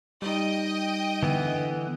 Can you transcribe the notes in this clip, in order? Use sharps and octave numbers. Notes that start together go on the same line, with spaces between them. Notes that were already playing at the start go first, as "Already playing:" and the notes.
G3 D#4 D#5 G5
D3 E3 B3